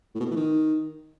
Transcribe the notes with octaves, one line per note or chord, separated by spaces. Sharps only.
A2
B2
A2
E3
D#3